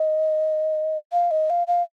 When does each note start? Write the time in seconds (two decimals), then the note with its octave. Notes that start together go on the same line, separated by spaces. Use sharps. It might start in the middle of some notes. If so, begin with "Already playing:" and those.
Already playing: D#5
1.12 F5
1.31 D#5
1.50 F5
1.67 F5